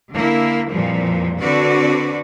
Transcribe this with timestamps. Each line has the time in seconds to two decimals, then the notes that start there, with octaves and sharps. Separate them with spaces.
0.12 D3 A#3 E4
0.71 F2 A#2 E3 F3 G3
1.40 D3 C4 F#4 B4 D5